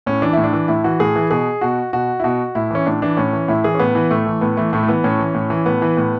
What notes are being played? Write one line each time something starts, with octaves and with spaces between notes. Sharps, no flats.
A2 C#4
E3 D4
A2 E4
D4
E3
A2 E4
E3 F#4
A2 G#4
E3
B2 G#4
B2 F#4
B2 F#4
E4
B2 F#4
A2 E4
E3 C#4
A2 D4
E3 D4
A2 C#4
E3
A2 E4
E3 G#4
C#4
A2 B3
E3
A2 A3
E3
A2 B3
E3 A3
A2 A3
A3
E3 B3
A2 C#4
E3
A2
E3
A2 B3
E3
A2